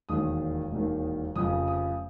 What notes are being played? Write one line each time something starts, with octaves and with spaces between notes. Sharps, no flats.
E1 D#2 D#3 D#6
E1 D#2 D#3
F1 F2 C#3 D#6
D#6